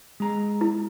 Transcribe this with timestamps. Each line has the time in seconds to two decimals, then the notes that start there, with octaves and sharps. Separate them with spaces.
0.20 G#3 A#5
0.61 E4